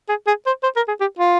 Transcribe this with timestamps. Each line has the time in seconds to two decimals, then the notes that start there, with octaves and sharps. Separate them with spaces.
0.09 G#4
0.27 G#4
0.46 C5
0.63 C5
0.76 A#4
0.88 G#4
1.00 G4
1.19 F4